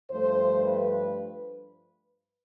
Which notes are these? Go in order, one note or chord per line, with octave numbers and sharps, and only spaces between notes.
G2 F3 A3 C5
B4